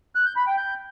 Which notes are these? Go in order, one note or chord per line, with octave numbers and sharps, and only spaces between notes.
F#6
G6
B5
G5
G6